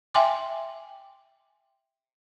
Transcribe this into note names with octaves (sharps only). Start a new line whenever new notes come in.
E5 G5 G#5 C6 D6